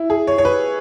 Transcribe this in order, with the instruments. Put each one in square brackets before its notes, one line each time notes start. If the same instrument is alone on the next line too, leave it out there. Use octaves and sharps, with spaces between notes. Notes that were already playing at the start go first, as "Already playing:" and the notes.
Already playing: [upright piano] E4
G#4
C#5
C#5
B4